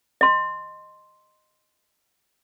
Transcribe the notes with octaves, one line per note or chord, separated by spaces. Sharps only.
D#5 C6